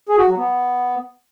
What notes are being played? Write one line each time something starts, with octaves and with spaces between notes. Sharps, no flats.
G#4
F#4
F#3
B3